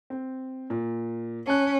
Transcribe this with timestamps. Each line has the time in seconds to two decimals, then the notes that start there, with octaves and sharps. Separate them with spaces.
0.10 C4
0.70 A#2
1.47 C#4 A5 F#6